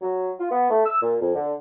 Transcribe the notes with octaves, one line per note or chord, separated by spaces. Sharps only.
F#3
F4
B3
A3
E6
A#2
F2
D3